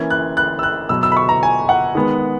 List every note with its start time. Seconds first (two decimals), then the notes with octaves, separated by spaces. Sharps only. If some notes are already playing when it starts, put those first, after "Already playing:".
Already playing: E3 A#3 C#4 G#6
0.10 F#6
0.37 F#6
0.59 E6
0.63 F#6
0.89 B2 F#3 B3 E6
1.03 E6
1.12 B5
1.17 C#6
1.29 A#5
1.43 G#5
1.69 F#5
1.95 D#3 G#3 B3